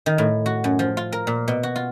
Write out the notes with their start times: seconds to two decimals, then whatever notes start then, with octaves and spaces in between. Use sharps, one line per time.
0.06 D#3
0.18 A2
0.46 F#4
0.64 F#2
0.79 F3
0.97 F4
1.12 A#4
1.27 A#2
1.48 B2
1.63 F#4
1.76 F4